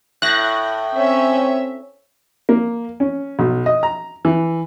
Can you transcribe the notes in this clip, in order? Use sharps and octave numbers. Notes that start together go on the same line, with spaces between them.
A2 F#6 A#6
C4 C#4 E5
A#3
C#4
B1
D#5
A#5
E3